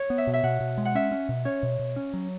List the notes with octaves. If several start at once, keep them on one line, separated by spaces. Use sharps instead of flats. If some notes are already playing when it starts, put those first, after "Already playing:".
Already playing: C#5
B3
E5
B2
E5
B2 F#5
B2
G#3
F#5
C#4 E5
C#4
B2
C#4 C#5
B2
B2
C#4
F#3